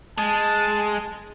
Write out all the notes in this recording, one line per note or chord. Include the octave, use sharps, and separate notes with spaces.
G#3 A5